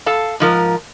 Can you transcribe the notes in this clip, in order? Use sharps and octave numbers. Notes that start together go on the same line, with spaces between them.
A4 F5 A5
G#2 F3 A#4